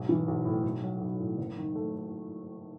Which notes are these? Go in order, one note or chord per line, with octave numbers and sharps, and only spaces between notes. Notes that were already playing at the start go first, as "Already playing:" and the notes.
Already playing: B1 G#2
E3
B1
A2
B1
F#3
B1
A2
F#1
D#3
A3